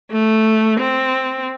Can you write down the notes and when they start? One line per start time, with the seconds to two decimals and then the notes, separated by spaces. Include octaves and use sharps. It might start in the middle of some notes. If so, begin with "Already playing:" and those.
0.11 A3
0.80 C4